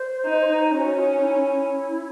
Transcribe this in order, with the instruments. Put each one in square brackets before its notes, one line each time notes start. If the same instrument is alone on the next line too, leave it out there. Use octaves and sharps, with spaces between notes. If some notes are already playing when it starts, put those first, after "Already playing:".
Already playing: [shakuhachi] C5
[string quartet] D#4
[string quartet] C#4 [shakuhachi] F#4
[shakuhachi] D#4
E4